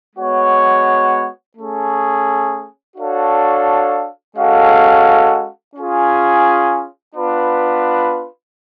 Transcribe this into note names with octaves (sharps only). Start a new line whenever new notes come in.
G#3 B3 F#4 C#5
A3 C#4 G#4
D4 F#4 A4 C#5 F5
G#3 C#4 F#4 A4 F5
C#4 F4 G#4
B3 D4 F4 B4